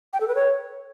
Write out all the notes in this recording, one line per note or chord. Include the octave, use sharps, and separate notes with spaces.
G5
A4
B4
C#5